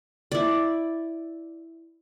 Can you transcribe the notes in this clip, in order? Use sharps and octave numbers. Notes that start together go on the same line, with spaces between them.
E4 D5